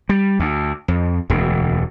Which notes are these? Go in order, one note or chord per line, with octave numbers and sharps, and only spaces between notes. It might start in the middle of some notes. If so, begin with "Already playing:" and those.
G3
D2
F2
E1 D2